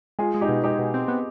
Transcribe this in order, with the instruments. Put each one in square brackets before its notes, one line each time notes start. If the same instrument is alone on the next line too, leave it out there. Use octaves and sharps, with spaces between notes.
[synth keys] G#3 [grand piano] F4 G#4
[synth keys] G#3
[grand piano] D#4 G4
[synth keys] B2
[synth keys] G#3 [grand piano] D#4 G4
[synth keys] B2
C4
B3